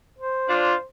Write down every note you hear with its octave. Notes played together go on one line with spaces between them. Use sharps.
C5
D4 F4